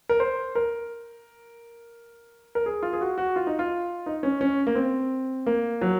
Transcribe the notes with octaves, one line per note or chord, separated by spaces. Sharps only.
A#4
C5
A#4
A#4
G#4
F4
G#4
F#4
F#4
F4
D#4
F4
D#4
C#4
C#4
A#3
C4
A#3
F#3